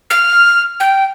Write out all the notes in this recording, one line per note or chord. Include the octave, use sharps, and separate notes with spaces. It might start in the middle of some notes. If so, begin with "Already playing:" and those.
F6
G5